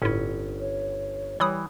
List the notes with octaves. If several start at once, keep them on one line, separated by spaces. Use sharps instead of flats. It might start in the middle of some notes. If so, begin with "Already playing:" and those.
G1 A2 C#4 E4
C#5
E3 G3 C#5 B5 D#6